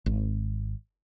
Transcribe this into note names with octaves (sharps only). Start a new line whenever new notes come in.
G#1